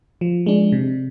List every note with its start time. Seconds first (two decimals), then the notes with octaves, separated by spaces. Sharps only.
0.21 F3
0.46 G#3 D4
0.72 C3